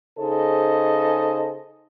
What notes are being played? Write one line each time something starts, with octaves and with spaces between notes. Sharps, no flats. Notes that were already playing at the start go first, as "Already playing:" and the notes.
C#3 D#4 G#4 A4 C5 D#5